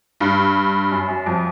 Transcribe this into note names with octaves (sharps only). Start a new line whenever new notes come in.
G2
F#2
F#2
F2